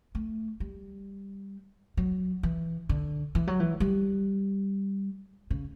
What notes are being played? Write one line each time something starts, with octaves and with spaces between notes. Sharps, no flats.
A3
G3
F#3
E3
D3
E3
F#3
E3
G3
C#3